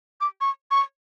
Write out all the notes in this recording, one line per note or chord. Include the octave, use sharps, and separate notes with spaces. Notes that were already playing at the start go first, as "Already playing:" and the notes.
D6
C#6
C#6